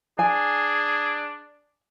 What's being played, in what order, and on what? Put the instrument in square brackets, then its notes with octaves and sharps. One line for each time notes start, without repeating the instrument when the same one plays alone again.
[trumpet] D4 [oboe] G#4 [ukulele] G#5